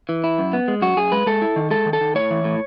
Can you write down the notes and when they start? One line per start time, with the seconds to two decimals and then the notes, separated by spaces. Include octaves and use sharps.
0.09 E3
0.24 E4
0.39 F#2
0.53 B3
0.68 G#3
0.82 F#2 F#4
0.97 F#2 G#4
1.12 G#3 B4
1.26 G#3 A4
1.42 E4
1.56 D#3
1.71 G#3 A4
1.86 D#3
1.93 A4
2.01 D#3
2.15 A2 C#5
2.31 E3
2.44 A2